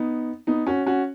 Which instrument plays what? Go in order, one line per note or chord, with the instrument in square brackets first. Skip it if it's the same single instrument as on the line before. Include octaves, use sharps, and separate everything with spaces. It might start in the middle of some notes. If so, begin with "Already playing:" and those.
Already playing: [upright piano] B3 D#4
B3 D#4
C#4 F#4
C#4 F#4